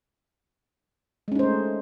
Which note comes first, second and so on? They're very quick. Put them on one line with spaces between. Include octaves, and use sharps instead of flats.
G#3 C#4 D#4 C5 A3